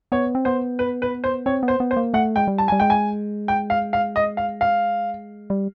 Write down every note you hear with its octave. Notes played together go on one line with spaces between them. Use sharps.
B3 C#5
C4
B3 C5
B4
B4
C5
C4 C#5
B3
C5
B3
C5
A#3
A3 F#5
G#3 G5
G3
A5
G3 G#5
G#3 G5
G#5
G5
F5
F5
D#5
F5
F5
G3